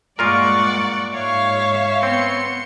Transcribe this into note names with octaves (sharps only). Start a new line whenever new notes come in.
G2 A#2 G#3 F4 A#4 D5 F#5 C#6
G#2 C#5 E5 F5
B3 C4 C6 C#7